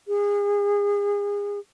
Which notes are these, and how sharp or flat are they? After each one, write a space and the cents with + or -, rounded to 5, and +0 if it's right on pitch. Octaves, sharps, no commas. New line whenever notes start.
G#4 -30